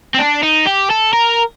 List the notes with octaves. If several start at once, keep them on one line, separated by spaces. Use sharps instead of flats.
C4
D4
D#4
G4
A4
A#4